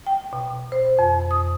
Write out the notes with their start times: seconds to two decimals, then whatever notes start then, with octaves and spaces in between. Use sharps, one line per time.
0.07 G5
0.33 B2
0.72 C5
0.99 F2
1.31 D#6